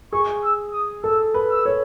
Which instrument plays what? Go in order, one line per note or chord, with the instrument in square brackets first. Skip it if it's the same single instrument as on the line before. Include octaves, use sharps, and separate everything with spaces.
[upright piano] G#4 [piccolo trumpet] C#6
[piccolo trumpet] E6
D#6
[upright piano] A4 [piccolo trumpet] E6
[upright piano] B4
[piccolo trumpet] E6
[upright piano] C#5